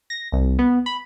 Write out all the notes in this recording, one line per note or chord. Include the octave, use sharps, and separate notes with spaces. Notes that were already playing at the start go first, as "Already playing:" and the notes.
A#6
C2
B3
B5